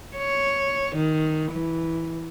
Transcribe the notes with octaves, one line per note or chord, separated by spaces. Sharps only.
C#5
D#3
E3